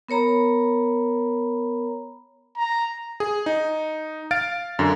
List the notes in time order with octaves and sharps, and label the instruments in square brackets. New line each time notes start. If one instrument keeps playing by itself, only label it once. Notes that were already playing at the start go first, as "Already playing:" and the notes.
[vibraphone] B3 A#4 C#5 A#5 B5
[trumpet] A#5
[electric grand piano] G#4
D#4
F5 F6 A6 D7
F#2 D3